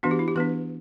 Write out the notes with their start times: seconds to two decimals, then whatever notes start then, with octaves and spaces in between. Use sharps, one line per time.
0.03 E3 B3 D4 F#4
0.11 G4
0.19 E4
0.28 G4
0.35 E3 B3 D4 B4